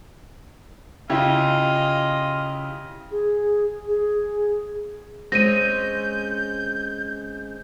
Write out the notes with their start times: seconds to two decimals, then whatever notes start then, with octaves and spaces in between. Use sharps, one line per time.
1.10 C#3 E4 F4 G4 D#5
3.11 G#4
3.87 G#4
5.32 G#3 C4 C#4 G6 A#6 D#7